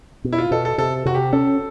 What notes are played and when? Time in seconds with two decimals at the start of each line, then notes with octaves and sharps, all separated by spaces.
0.24 B2
0.33 E4
0.38 F4
0.51 B2 A4
0.65 A4
0.78 C3 A4
1.06 C3 F#4
1.14 G4
1.33 C#4 A4